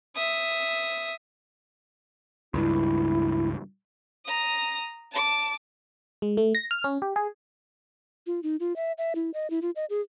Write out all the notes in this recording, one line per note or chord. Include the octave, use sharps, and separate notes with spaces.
E5 D#6
C#2 G2 E4
A#5 D#6
A5 D6
G#3
A3
A#6
F6
C#4
G4
G#4
F4
D#4
F4
E5
E5
E4
D#5
E4
F4
D#5
G#4